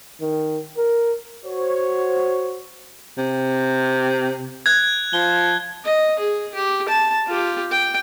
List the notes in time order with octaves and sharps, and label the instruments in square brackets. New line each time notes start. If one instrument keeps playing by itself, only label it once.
[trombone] D#3
A#4
[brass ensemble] F#4 C5 C#5
[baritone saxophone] C3
[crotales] F#6 G#6
[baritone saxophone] F3 [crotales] G7
[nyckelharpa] D#5
G#4
G4
A5
F4 G4
G5